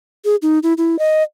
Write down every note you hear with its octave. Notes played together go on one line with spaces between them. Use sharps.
G#4
D#4
E4
E4
D#5